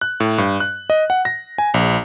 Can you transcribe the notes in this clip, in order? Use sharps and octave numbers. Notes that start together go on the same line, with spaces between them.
F#6
A2
G2
F#6
D#5
F#5
A#6
G#5
A#1